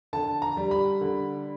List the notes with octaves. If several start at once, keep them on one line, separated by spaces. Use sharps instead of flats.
D3 A5
A#5
G3
B5
D3